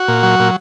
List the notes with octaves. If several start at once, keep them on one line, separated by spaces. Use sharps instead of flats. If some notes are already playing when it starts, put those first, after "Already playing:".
Already playing: F#4
A#2
F#3
A#2